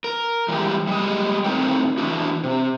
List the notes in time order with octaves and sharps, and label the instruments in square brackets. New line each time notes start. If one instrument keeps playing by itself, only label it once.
[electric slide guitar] A#4
E3 G3 G#3 G4
G3 G#3 D#5
A2 C4 D#4 A#4 C#5 G5
E3 D4 F#4
C3